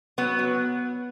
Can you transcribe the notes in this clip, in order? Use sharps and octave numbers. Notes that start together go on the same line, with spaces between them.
F#3 B3
F#3